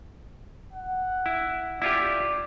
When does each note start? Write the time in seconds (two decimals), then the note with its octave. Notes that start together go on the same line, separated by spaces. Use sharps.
0.73 F#5
1.26 E4
1.82 E4 F4 G4 D5